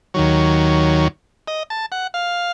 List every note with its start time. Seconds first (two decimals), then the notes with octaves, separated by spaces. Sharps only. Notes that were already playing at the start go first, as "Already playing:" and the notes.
0.14 D#2 D#3 F#3 C#5
1.48 D#5
1.70 A5
1.92 F#5
2.14 F5